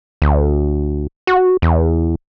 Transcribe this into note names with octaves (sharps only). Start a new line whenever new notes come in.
D2
F#4
E2